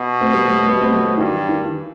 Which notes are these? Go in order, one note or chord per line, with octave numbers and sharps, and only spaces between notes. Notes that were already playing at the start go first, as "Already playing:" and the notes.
Already playing: B2
A3 C4
G3 B3
F#3 A3
F#3 A3
G3 B3
A3 C4
F#3 A3
F#3 A3
G2 D#3 F#3
E3
D#3
E3